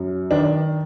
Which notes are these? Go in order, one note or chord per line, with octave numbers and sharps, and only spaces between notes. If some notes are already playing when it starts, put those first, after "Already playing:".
Already playing: F#2
D#3 D4